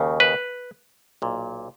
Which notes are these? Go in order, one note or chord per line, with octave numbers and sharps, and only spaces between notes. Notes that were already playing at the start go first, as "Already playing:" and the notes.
Already playing: D#2 C#3
B4
B1 A#2